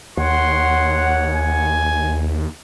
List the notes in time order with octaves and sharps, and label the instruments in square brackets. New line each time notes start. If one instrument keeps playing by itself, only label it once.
[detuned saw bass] D#2 [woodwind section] C#5 F#5 [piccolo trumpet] C6
[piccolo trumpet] G#5